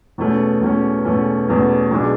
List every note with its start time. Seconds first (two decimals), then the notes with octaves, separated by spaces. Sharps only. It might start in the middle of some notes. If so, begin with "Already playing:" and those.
0.18 E2 B2 A3 C#4
0.61 E2 B2 A3 C#4
1.05 E2 B2 A3 C#4
1.48 E2 B2 A3 C#4
1.91 B1 B2 G#3 D4 G#4